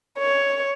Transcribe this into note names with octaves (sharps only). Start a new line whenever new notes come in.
C#5